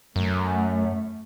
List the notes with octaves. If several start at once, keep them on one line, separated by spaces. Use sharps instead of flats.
F#2 A3